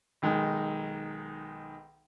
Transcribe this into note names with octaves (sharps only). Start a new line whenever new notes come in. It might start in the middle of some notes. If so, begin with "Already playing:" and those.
B1 D#3 G#3